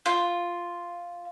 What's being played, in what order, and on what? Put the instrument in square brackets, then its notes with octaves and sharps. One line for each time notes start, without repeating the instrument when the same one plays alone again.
[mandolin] F4